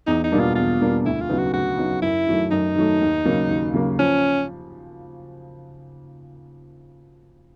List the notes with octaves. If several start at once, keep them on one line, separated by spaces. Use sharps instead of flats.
E2 D#4
D#4
B2 G3 A#3 D4
F4
E2 F4
B2 G3 A#3 D4
D2 E4
F4
C#3 F#3 B3 D#4
F#4
D2 F#4
C#3 F#3 B3 D#4
F#2 E4
D#3 F#3 A3
F#2 D#4
D#3 F#3 A3
D#2
C#3 F#3 A#3
D#2
C#3 F#3 A#3
F3 C#4